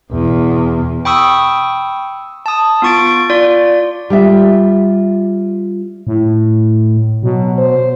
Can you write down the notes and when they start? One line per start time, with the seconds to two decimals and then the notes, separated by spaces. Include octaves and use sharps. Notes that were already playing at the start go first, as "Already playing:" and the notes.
0.12 E2 B2
1.05 G5 B5 C#6 D#6 E6
2.46 A5 D#6
2.82 B3 F4 C#6 A6 D7
3.30 F4 D5
4.10 G3 F4 E5
6.07 A2
7.23 B2 F#3
7.58 C5